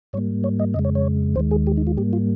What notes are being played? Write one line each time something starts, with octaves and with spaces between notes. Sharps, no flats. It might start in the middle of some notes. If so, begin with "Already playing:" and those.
G#2 G3 A#3 C#5
C#5
D#5
F2 C#3 G#3 D#5
C#5
C#5
D#2 D#3 G#3 C5
G#4
G4
D#4
F4
G#2 G3 A#3 G4
F4